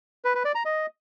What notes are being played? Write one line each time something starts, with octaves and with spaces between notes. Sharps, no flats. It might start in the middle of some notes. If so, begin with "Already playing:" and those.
B4
B4
D5
A#5
D#5